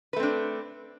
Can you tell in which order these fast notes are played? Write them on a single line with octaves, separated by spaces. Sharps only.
B4 A3 C4 D4